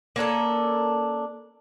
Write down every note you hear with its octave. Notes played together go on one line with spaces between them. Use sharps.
A#3 C#4 D4 A4